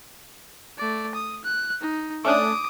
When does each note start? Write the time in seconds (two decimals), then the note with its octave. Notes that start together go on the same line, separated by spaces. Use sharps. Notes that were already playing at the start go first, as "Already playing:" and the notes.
0.78 A3 D5
1.15 D#6
1.44 F#6
1.81 D#4
2.25 A3 C#4 D4 D6 D#6